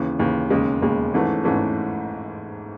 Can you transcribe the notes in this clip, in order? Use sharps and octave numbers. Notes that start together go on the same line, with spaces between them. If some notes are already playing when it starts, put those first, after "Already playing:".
Already playing: D#2 C#3 E3
D#2 C#3 E3
E1 D#2 C#3 G#3
E1 D#2 C#3 G#3
G#1 G#2 E3 A3 C#4
G#1 G#2 E3 A3 C#4